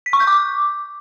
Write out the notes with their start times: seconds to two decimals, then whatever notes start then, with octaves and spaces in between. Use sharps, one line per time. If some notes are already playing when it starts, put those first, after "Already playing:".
0.06 B6
0.13 C#6
0.20 G6
0.27 D6